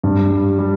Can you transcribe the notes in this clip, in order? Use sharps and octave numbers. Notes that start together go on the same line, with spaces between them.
G2
G3
G3